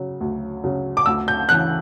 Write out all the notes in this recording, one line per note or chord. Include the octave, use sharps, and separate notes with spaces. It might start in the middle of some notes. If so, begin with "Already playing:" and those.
Already playing: C#3 F#3
D2
C#3 F#3
D6
D2 E6
G6
C#3 E3 F#6